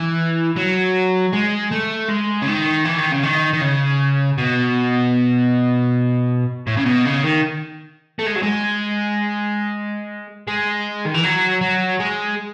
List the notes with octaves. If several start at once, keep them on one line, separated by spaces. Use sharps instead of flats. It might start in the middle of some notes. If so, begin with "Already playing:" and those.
Already playing: E3
F#3
G#3
A3
G#3
C#3
D#3
E3
D#3
C#3
D#3
D#3
C#3
B2
A2
C#3
B2
C#3
D#3
A3
G#3
F#3
G#3
G#3
D#3
E3
F#3
F#3
G#3